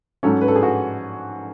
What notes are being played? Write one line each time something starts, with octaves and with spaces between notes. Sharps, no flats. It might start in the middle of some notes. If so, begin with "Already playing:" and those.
G#2 F#3 C#4 A4
B4
A4
G#4
F#4